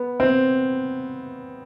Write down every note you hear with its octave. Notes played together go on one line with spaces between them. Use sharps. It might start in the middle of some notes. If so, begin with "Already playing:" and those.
Already playing: B3
C4